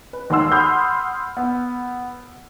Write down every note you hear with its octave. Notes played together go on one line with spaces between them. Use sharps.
B4
D#2 G#2 F#5 C6 E6
F#5 B5 C6 D#6 F6 G6
B3